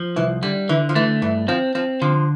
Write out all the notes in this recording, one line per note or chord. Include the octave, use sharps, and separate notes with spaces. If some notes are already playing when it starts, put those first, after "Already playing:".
Already playing: F3
C2 E3
D3 G3
D3 E3
F3
E3 A3
G2 E3
F3 C4
F3 C4
D3 F3